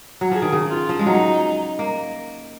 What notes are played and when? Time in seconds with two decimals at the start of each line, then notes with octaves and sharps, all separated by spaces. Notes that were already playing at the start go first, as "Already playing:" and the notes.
0.21 F#3
0.31 F3 G#4
0.42 D#3
0.52 C#3
0.70 F4
0.89 F3
0.99 G#3
1.06 F#3 D#4
1.79 A#3